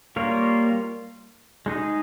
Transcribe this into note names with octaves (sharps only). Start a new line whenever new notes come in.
G3 A#3 F4 A#4 C#5
G#3 D#4 G#4